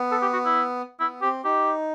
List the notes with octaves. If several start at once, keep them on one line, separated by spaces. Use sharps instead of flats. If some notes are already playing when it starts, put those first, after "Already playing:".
Already playing: B3
A4
G4
F#4
E4
B3 E4
C4 G4
D#4 G4